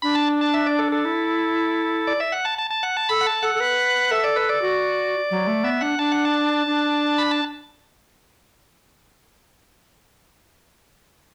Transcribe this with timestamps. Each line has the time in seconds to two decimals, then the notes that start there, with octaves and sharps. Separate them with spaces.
0.02 D4 B5
0.15 A5
0.41 A5
0.54 E5
0.66 D5
0.79 A4
0.92 A4
1.05 E4
2.07 D5
2.20 E5
2.32 F#5
2.45 A5
2.58 A5
2.71 A5
2.83 F#5
2.97 A5
3.09 A4 B5
3.21 F#5
3.27 A5
3.42 A4 F#5
3.55 A4
3.60 B4
4.11 A4 E5
4.24 D5
4.36 B4
4.49 D5
4.62 F#4
5.31 F#3
5.47 A3
5.64 B3 E5
5.81 D4 F#5
5.98 D4 A5
6.12 F#5
6.25 A5
6.66 D4
7.18 B5
7.31 A5